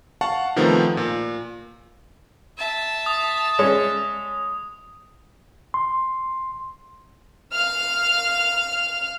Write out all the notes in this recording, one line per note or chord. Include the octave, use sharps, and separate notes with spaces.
F5 F#5 A5 C#6
C3 D#3 F3 A3 B3
A#2
E5 A5
D#6
G#3 C#4
C6
F5 F6